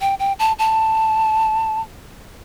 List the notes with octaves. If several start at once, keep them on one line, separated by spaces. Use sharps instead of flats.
G5
G5
A5
A5